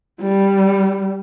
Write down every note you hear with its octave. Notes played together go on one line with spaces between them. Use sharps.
G3